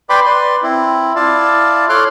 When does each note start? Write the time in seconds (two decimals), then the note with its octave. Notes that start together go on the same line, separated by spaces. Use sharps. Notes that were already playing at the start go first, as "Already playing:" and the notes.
0.10 B4 D5 G5 B5 C6 D6
0.26 B4 D5 C6
0.63 C4 E4
1.16 E4 F4 D5 F5 A5
1.89 A4 C#5 C6 D6 F6 F#6